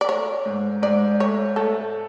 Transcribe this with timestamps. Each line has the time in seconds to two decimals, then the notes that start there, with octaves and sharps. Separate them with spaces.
0.01 D5
0.09 A3 C#5
0.46 G#2
0.82 G#2 D5
1.20 A3 C#5
1.56 A3 A4